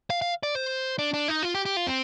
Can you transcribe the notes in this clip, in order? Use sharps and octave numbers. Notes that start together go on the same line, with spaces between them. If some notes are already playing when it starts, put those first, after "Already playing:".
F5
F5
D5
C5
D4
D4
D#4
F4
G4
G4
F4
C4